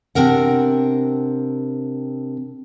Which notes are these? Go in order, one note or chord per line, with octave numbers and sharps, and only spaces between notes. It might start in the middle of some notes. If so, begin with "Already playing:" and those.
C3 C4 D4 A#4 F#5